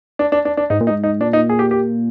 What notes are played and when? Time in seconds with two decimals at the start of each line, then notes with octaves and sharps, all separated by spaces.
0.19 D4
0.32 D4
0.45 D4
0.57 D4
0.70 G#2 D#4
0.81 A#2
0.87 D#4
0.90 G#2
1.04 D#4
1.20 A#2 D4
1.33 D#4
1.49 G#4
1.59 G4
1.71 G4